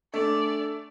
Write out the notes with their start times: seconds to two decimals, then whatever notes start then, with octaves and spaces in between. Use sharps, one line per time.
0.14 A3 D4 D5